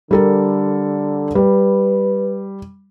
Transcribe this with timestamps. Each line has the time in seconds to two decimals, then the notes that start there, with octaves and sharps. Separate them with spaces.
0.11 D3 G3 A4 A#4
1.35 G3 B4